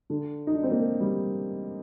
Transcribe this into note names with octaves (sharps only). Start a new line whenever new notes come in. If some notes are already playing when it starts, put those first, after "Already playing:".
D3
D#4
D4
C4
A#3
G3